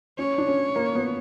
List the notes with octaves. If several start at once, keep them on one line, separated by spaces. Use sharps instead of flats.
C#4 C#5
D4
C#4
A#3
B3